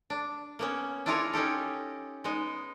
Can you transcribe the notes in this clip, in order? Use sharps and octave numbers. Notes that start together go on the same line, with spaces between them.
D4
A#3 B3 C#4
D4 E4 F4 G#4 A#4 C#5
C#4 D#4 G4 A4
G#3 B3 D#4